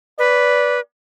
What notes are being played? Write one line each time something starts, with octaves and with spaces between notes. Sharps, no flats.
B4 D5